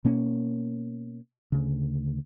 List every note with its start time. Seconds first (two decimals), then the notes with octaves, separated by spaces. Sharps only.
0.05 B2 A#3 C#4
1.52 D2 C#3